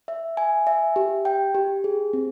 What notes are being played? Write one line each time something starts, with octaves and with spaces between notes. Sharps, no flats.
E5
G#5
E5
G4
G5
G4
G#4
C4